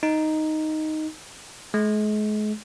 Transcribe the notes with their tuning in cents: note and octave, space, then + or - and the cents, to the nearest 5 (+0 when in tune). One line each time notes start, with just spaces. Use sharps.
D#4 +0
G#3 +40